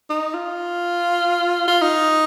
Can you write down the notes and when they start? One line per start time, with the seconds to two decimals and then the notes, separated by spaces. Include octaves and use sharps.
0.10 D#4
0.34 F4
1.68 F4
1.81 D#4